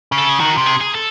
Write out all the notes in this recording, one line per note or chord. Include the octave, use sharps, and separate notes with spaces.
C#3
A4
G#4
D#3 F#4
C3
G#4
G#4
A4